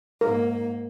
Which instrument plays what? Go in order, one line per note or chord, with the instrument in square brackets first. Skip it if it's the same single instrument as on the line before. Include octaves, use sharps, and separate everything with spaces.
[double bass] G#2 A#3 [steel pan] A#4